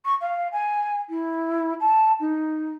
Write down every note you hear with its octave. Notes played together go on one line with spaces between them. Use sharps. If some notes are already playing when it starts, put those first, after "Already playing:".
C#6
F5
G#5
E4
A5
D#4